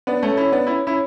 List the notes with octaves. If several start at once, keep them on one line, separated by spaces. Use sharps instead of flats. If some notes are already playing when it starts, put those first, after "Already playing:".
B3 D4
A3 C#4
C#4 E4
B3 D4
C#4 E4
C#4 E4